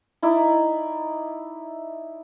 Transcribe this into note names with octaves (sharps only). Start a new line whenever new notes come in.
D#4 E4 D5